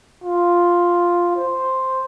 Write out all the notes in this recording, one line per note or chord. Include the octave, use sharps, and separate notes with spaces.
F4
C5